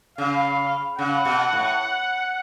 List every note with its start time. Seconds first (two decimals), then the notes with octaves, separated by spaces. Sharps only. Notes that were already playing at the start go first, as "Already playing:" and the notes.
0.18 C#3 F5
0.99 C#3 F#5
1.25 B2
1.53 A2